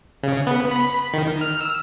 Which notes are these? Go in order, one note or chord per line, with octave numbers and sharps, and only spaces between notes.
C#3
B3
B5
D#3
F6
E6